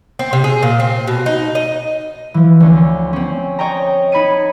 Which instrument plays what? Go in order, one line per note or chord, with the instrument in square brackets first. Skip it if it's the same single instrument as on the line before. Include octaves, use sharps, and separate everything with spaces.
[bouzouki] C4
C3
G#4
A#2
C4
B2
D#4
D#5
[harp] E3 F3
D2 C#4 C6
C4 C#4
C#5 D#5 G5 A#5
D#4 B5 G#6 C#7 D#7